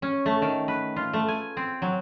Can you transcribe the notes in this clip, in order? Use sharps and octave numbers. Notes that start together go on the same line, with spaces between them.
C#4
A3
D#3
B4
F4
A3
G#5
C4
F#3